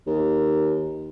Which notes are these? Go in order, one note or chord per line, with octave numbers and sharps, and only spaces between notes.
D#2